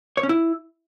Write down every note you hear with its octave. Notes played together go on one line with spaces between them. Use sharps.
C#5
C#4
E4